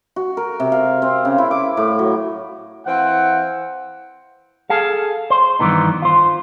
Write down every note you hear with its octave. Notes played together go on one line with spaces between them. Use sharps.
F#4
A#4
C3
F5
C4
C#3
E4
D6
A2
F#3
E3 C4 F5 F#5
G#4 A4 F5
C5
G2 D#3 E3 B3 D#4
F4 C5